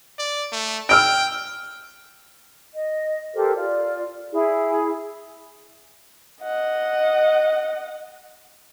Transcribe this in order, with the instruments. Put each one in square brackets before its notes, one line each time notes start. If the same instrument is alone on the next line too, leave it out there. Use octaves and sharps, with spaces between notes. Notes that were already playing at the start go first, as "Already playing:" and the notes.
[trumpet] D5
A3
[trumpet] G5 [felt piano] E6 F6 D7
[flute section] D#5
G4 A4 A#4 C5
F4 D5
E4 G#4
[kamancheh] D#5 F#5